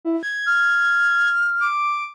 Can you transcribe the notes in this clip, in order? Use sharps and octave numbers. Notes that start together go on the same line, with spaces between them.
E4
G#6
F6
D6